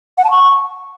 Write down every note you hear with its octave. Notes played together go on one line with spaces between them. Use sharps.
F#5
A5
C#6